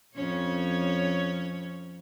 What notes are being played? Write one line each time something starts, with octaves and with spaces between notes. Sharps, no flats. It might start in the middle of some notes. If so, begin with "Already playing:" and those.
F2 C#4 C#5